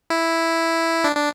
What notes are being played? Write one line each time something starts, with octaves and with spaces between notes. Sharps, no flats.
E4
D4
D4